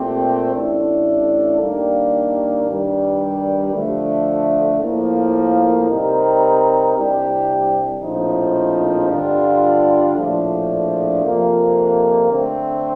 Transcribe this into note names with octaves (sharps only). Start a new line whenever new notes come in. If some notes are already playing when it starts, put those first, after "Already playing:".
Already playing: A#2 A3 C4 G4
A1 A2 A3 D4 A4
D#2 D#3 G3 A#3 D4
G2 D#3 G3
D3 F3 A3
A2 F3 A#3
C3 G3 C4 D#4 A#4
C2 C3 G3 D4 G4
A#1 A2 F3 C4 D#4
G2 D3 G3 D4 F4
A#1 A2 F3 A3 D4
F2 C3 F3 A#3
D3 A3 C4